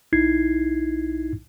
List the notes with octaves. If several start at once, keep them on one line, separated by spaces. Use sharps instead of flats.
B1 D#4 E4 G#6 C7